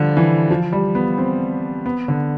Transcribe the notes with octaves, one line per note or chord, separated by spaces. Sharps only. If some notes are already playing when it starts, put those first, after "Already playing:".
Already playing: D3 F3 G3
E3
F3
G3
B3
C4
B3
D3